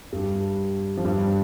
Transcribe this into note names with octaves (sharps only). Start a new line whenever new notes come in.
G2 G3
F3
G2 G3